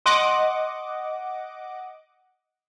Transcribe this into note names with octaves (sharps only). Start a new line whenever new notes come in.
D#5 F#5 C6 D6